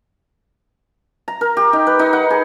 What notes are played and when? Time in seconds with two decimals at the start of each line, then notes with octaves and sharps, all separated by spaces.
1.28 A#5
1.41 A#4
1.57 G4
1.73 D#4
1.87 B4
1.99 D#4
2.13 F#5
2.31 G#4